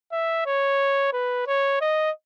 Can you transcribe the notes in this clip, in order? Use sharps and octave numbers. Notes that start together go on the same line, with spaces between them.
E5
C#5
B4
C#5
D#5